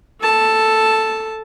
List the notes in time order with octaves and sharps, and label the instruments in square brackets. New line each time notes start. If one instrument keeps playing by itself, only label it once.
[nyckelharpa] A4 A5